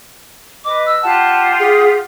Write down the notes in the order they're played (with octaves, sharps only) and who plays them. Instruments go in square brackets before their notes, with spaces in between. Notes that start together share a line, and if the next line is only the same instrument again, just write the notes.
[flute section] B4 D#5 [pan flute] D6
[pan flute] E6
[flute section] F4 G4 F#5 [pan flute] A5
[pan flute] G#4